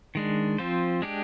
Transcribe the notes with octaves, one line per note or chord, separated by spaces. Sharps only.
D#3 G#3 D4
F3 C4 F4 C5
G#3 D4 G4